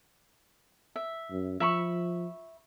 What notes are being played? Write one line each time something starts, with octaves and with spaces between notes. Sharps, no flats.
E5
F#2
F3 E5 B5 C#6